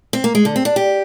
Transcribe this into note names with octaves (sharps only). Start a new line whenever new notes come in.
C4
A#3
G#3
D3
C4
D4
G4